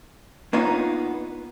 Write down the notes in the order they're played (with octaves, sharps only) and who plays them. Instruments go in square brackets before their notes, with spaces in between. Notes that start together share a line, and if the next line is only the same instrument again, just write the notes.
[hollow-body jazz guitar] A#3 B3 D4 D#4 F4 C#5